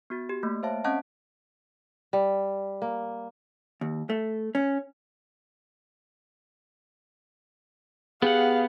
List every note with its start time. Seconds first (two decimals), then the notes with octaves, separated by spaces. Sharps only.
0.10 B3 F#4 A6
0.29 G4
0.43 A3 A#3
0.63 C5 C#5 E5 F5 A5
0.84 C4 C#4 D#5 F#5 A5
2.13 G3
2.82 A#3
3.81 D#2
4.10 A3
4.55 C#4
8.22 B3 G4 G#4 F5 F#5